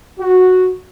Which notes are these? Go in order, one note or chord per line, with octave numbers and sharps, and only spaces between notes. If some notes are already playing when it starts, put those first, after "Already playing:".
F#4